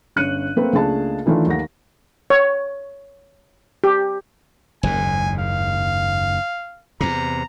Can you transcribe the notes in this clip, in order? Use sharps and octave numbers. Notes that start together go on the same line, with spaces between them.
G1 C#4 F#6 C#7 D#7
A3 A#3 C4 A4 B4
C#2 A3 A#3 D4 G#4 A5
D#3 E3 A3 D4 F4
D#2 A3 F#5 A#6
C#5
G4
F#1 D#2 G#2 G#5
F5
E2 C3 A#5